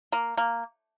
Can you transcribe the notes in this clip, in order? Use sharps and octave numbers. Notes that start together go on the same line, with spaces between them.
A#3
A#3